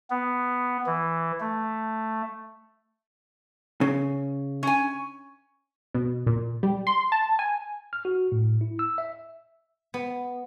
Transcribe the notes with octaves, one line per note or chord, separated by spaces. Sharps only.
B3
E3
A3
C#3
C#4 G#5
B2
A#2
G3
C6
A5
G#5
F6
F#4
A2
E4
E6
E5
B3